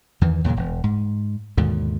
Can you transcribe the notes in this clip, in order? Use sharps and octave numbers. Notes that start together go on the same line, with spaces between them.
E2 D#3 E3
D#2 A#2 C#3 F#3
E1
G#2
D#2 G#2 B2 D3